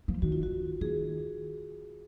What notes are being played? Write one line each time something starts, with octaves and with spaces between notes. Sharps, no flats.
F3
D#3 F#4
F4
F#4
D#3 G#4